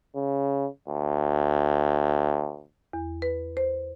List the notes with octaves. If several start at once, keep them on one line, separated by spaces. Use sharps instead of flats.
C#3
D2
E2
B4
C5